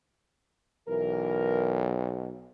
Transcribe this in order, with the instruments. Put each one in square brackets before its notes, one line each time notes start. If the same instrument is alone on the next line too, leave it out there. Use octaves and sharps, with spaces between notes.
[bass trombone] B1 [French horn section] E3 A#4